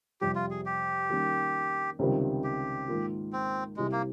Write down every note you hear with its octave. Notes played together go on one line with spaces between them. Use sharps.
F2 C3 G3 G4
F4
G#4
G4
D#3 G3 A#3 C#4
C#2 C3 D#3 G3 C4
G4
G#2 D#3 A#3 F4
C4
C2 C3 G3 G#3
A#3